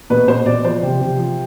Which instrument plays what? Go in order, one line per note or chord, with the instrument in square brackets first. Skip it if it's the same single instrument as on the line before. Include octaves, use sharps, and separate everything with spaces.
[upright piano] B2 B4
B2 C5
B2 D5
F3 C5
C3
C3
F3